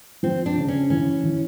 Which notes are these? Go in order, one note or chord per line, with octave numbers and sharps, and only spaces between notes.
F3 C4
D4
C#3
C#4
E3 C#4
E3